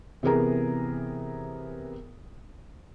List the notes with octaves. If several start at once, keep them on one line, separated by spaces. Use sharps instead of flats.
C3 E3 B3 G#4 A#4 A#5